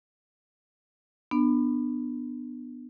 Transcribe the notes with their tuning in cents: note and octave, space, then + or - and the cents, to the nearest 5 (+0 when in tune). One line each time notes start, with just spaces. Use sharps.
B3 +0 D4 +25